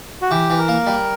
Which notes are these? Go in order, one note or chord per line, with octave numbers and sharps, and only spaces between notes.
F#4
E3 G4
E3
A#4
A#3
G3